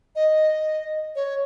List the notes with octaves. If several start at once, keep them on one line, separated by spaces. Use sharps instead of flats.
D#5
C#5